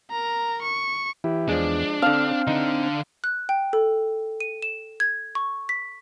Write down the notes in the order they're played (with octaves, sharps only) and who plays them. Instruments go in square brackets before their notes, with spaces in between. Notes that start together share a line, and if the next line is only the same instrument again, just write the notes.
[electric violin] A#4 A#5
C#6
[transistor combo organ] E3 E4 G4
[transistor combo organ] E2 [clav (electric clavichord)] F3 G#3 [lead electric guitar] D4
[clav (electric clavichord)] D3 A5 [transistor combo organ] C4 [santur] F5
[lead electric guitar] D3 D4 [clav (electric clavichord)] D#4
[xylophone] F#6
G5
A4
D#7
E7
G#6
C#6
B6